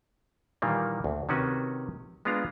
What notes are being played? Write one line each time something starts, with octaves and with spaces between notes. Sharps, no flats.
A#2 D#3 E3 G3 A#3
D2
C3 D#3 C#4 F#4 B4
G#3 B3 D4 F4 A#5